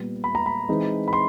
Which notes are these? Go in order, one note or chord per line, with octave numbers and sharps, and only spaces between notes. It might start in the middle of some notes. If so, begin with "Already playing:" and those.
Already playing: A#2 G3 B3
B5
A#5
B5
E3 G#3 C4 D#4
B5
C6